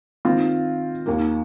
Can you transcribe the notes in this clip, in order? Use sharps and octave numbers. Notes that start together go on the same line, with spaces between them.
D#3 C4 F4
D#2 D#3 A#3